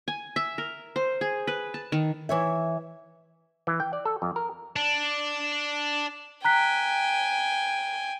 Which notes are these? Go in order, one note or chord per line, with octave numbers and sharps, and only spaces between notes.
G#5
E5
A#4
C5
G#4
B4
A5
D#3
E3 C#5 E5
E3
G5
D5
A4
F2
A#4
D4
G5 G#5 A#5 F#6 B6